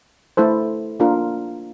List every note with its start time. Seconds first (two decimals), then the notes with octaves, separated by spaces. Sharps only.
0.37 A3 E4 A4 C5
1.00 A#3 D4 F4 A#4